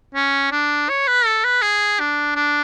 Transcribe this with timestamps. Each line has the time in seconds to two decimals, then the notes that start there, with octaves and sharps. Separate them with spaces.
0.15 C#4
0.52 D4
0.89 C#5
1.07 B4
1.26 A4
1.44 B4
1.62 G#4
2.00 D4
2.35 D4